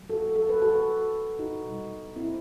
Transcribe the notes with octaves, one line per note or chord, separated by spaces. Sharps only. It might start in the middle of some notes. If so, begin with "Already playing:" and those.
Already playing: D#3 F#3 A3
F#4 A4
A4
B4
F#4 A4
D#4 F#4
B2 G3
C4 E4